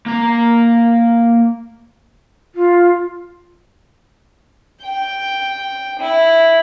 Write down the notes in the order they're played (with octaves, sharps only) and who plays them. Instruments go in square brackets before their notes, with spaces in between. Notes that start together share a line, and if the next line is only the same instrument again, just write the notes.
[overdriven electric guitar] A#3 A#5
[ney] F4
[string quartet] G5
E4